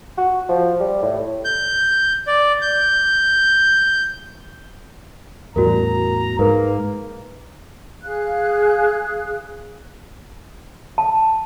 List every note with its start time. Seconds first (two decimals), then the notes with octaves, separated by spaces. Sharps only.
0.18 F#4
0.49 F3
0.80 G3
1.02 A2
1.45 G6
2.27 D5
2.62 G6
5.56 E2 A2 G3 F#4 A#4 A#5
6.39 G#2 A#3 A#4 B4
8.03 G#4 F5 F#6
10.98 A5